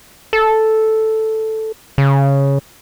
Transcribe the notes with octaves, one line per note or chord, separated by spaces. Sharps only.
A4
C#3